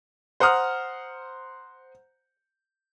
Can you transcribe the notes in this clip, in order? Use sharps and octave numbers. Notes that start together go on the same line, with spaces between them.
C5 F#5 A#5 D#6 F6